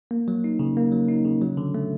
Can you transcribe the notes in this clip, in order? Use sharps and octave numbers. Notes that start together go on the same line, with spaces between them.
A#3
F#3
D#4
C#3
A#3
F#3
D#4
C#3
F#3
D3
A3